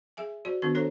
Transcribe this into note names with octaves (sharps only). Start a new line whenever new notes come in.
G#4 E5 G#5
F#4 C5 D5
D#3 B3 D4 F#4 B4
D4 A4 C5 C#5 A#5